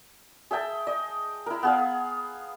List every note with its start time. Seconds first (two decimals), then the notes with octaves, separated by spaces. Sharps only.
0.51 G#4 E5 G5 A5
0.87 D#5
1.46 E4 A#4
1.63 B3 G#4 F5